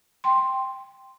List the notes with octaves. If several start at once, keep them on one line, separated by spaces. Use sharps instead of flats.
G5 C6